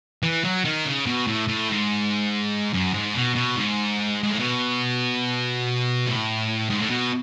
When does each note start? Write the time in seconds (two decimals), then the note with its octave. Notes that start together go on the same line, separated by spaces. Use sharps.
0.23 E3
0.44 F#3
0.65 D#3
0.85 C#3
1.06 B2
1.27 A2
1.48 A2
1.69 G#2
2.73 F#2
2.93 G#2
3.15 B2
3.35 B2
3.56 G#2
4.23 G#2
4.30 A2
4.39 B2
6.07 A2
6.70 G#2
6.79 A2
6.90 B2